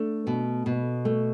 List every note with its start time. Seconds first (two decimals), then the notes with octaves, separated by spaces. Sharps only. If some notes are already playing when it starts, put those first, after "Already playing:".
Already playing: A3 D4
0.27 B2
0.66 B2
1.05 A3